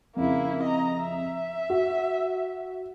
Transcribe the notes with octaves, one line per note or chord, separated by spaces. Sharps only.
F2 C#3 A#3 E4
D#5 A#5
E5
F#4